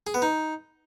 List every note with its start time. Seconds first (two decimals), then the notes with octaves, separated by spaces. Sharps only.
0.07 G#4
0.14 B3
0.22 D#4